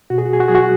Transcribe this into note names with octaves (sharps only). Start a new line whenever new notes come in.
B2 F#4
G#4
F#4
G#4
F#4
F#3 G#4
F#4